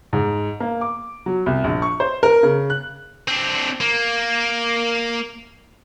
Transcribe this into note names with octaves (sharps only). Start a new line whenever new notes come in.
G#2
A#3
D6
F#3
C2
A#1
C#6
C5
A#4
C#3
F#6
C4 D4
A#3